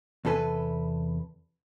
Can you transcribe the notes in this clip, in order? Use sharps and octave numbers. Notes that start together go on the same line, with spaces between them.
E2 C3 A4 B4 G#5